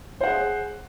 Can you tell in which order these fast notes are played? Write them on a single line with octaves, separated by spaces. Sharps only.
C5 F#5 G#4